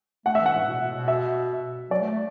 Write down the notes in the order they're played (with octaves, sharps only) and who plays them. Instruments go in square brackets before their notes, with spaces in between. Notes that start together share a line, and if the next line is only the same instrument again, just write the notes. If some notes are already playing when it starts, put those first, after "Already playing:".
[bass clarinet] A3 [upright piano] F#5
[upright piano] E5
[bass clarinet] E3
[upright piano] F#5
[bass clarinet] A2
B2
B2
B2
[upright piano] E5
[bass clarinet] F#3 [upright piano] D5
[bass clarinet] A3
A3